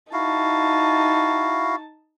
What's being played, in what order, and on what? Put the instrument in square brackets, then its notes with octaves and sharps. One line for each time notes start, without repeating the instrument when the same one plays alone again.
[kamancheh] D#4 A5 [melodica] E4 F#4 F5